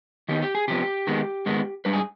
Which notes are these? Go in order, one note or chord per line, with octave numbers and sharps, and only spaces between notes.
D#3 B3 D#4 G4
G4
G#4
C3 F3 B3 G4
D#3 G#3 B3
G#2 D#3 G#3 B3
G#2 G3 D4 B4
G#4